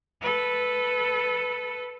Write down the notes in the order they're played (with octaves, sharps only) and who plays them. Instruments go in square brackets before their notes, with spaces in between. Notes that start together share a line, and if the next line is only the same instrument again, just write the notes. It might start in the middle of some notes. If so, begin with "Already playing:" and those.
[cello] A4 B4